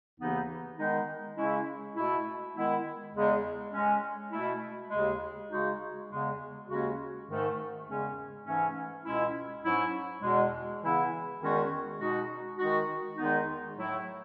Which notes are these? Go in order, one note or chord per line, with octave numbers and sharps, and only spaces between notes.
D#2 C#3 E3 B3 D#4
D#3 G#3 B3 D#4
C#3 G#3 C#4 E4
B2 A3 E4
D#3 G#3 B3 E4
E2 C#3 G#3
A2 G#3 C#4
B2 A3 E4
D#2 C#3 G#3
C#3 G#3 D#4 F#4
E2 C#3 G#3
D#2 C#3 G#3 C#4 F#4
G#2 D#3 A3
E2 C#3 G#3 C#4
G#2 E3 A3 C#4
C#2 B2 G#3 C#4 E4
G#2 F#3 C#4 E4
E2 B2 G#3
C#3 E3 B3 E4
E2 D#3 G#3 C#4 F#4
B2 G#3 D#4 F#4
D#3 G#3 D#4 F#4
E2 D#3 G#3 B3 D#4
A2 F#3 A3 E4